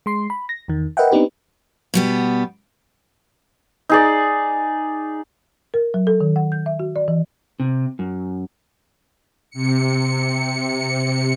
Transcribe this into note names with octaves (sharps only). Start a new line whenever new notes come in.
G#3 C6 C7
B5
A#6
E2 D#3
A#4 B4 D#5 E5 F#5 G5
B3 C4 D4 D#4 G4 B4
B2 G3 B3
D#4 G#4 D5
A#4
F#3
A4
D#3
F#5
G6
E5
F#4
D5
E3
C3
F#2
C3 C#7